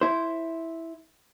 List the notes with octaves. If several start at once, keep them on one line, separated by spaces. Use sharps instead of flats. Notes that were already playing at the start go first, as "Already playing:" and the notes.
E4 C5